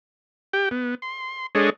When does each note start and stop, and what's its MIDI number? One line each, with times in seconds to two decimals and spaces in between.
0.53 0.69 67
0.53 0.69 79
0.71 0.95 59
1.02 1.46 84
1.55 1.70 56
1.55 1.70 62
1.55 1.70 68
1.55 1.70 69
1.55 1.70 73
1.55 1.70 75